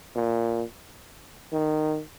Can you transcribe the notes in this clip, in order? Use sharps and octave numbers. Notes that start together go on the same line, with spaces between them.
A#2
D#3